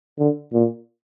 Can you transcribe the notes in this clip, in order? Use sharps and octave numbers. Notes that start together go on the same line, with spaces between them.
D3
A#2